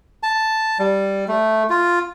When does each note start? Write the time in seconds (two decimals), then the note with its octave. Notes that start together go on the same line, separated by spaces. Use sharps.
0.23 A5
0.79 G3
1.28 A3
1.70 F4